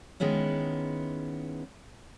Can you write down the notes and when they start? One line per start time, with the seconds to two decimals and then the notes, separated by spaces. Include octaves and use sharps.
0.20 D#3 G#3 B3 C#4 E4